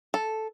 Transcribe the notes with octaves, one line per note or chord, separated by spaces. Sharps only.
A4